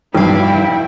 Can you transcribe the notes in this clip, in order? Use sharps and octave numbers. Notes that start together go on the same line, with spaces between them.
F1 B1 G2 E4 F5 G5